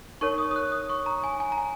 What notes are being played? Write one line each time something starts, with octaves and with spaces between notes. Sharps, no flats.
D#4 A#4 C#5 C#6
D#6
D#6
F#6
D#6
C#6
A#5
G#5
G#5
A#5
G#5